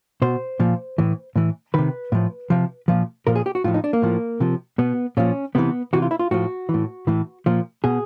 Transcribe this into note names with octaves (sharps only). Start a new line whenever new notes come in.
B2 C5
A#2 F3
A2 E3
A2 E3
C3 D#3 B4
A2 F3
C3 F3
A#2 F3
A#2 F3 A#4
G#4
G4
F#4
A2 F3 F4
D#4
D4
A#3
A2 F3
C3 F3
B2 B3
A#2 F3 C#4
C3 E3 B3
C3 E3 F#4
F4
E4
F4
A2 F3 F#4
E3
A2
A2 E3
A#2 F3
B2 G#4